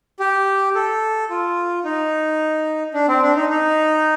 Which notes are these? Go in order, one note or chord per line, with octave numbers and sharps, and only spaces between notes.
G4
A4
F4
D#4
D4
C4
D4
D#4
D#4